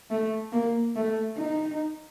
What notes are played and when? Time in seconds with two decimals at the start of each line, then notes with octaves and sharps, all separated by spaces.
0.11 A3
0.52 A#3
0.96 A3
1.37 D#4